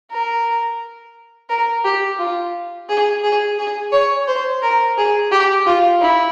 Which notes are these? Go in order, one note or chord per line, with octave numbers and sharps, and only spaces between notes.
A#4
A#4
G4
F4
G#4
G#4
G#4
C#5
C5
A#4
G#4
G4
F4
E4